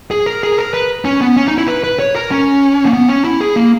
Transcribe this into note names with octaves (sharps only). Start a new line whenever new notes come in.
G#4
A#4
G#4
A#4
B4
C#4
B3
C#4
D#4
E4
B4
B4
C#5
A#4
C#4
A#3
B3
C#4
E4
G#4
A#3